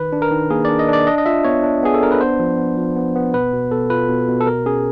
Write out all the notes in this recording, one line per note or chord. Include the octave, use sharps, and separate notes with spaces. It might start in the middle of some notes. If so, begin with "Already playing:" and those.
Already playing: D#3 B4
D4
A#4
D#3
A#3 G#4
D4 D5
D#5
D4 D5
D4 D#5
D#5
F4 E5
B3 C#5
D4
B3 G#4
A4
D4 A#4
B4
B3 C5
F3
B3
F3
B3
B3
B2 B4
B2
B2 A4
F4 B4
B2
B2
A4
B2 A#4
C#4 G#4